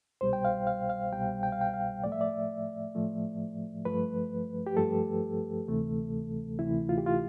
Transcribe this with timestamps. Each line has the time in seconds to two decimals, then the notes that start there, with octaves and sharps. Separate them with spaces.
0.21 C2 B2 G3 C5
0.33 G5
0.45 F5
0.67 F5
0.89 F5
1.12 C2 B2 G3 G5
1.43 G5
1.52 F5
1.61 G5
1.74 F5
2.04 A2 F3 A3 D5
2.12 E5
2.21 D5
2.95 A2 F3 A3
3.85 G2 F3 A3 B4
4.67 G4
4.77 G2 F3 A3 A4
5.68 D2 C3 E3 A3
6.59 D2 C3 E3 A3 E4
6.89 F4
6.98 G4
7.06 F4